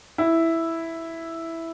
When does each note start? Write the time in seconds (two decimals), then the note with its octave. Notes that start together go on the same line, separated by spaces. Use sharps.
0.18 E4